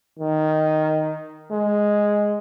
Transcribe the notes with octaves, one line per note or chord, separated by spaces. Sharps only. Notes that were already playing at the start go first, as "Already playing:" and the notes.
D#3
G#3